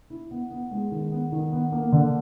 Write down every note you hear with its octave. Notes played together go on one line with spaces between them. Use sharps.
E4
B3
B3
G#3
D#3
B3
D#3
B3
A#3
D3